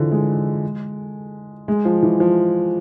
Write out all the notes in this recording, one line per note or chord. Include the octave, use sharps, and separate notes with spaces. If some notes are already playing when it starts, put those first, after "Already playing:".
Already playing: D3 E3 F3
G#3
G#3
F3
E3
F3